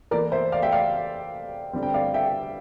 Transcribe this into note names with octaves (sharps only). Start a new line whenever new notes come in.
E3 A#3 A#4 D5
C5 E5
D5 F5
E5 G5
D5 F5
D3 G3 C4
G5
D5 F5
E5 G5